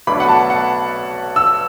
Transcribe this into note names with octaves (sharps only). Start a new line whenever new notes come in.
B1 B2 A3 D4 B5
F#5
A5
F#5
E6